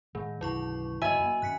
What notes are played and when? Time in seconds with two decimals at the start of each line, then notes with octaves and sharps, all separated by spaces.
0.15 A2 D#3 G#3 A3
0.41 B1 F#2 D3 F#3 E4 C#6
1.02 G1 D#2 D3 F#4 D#5 E5 G#5
1.20 F#2 A#3
1.42 F#2 D#3 C#4 F#6 B6 C#7